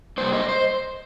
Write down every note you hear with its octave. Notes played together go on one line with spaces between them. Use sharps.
C3 G3 A#3 C5
D#5
C5